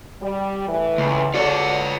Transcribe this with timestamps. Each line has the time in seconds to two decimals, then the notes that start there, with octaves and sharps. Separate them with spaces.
0.22 G3
0.68 A2 E3
0.98 C#2
1.34 F4 F#4 A4 C#5 D5